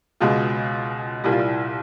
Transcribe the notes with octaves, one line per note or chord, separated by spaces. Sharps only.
C#2 B2 G#3 F4
C2 A#2 G3 E4
F4
E4